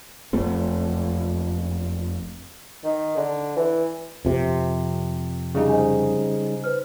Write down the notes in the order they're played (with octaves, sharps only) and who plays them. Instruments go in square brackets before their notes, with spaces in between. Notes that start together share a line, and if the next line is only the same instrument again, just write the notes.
[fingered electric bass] F#1 F2 A3 C4
[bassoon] D#3
D3
E3
[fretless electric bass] F2 C3
[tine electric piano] C#3 G3 D#4
[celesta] C5 D#5 G#5
B4 C5 F6